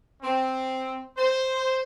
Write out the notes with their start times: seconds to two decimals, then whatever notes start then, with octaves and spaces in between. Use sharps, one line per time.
0.22 C4
1.17 C5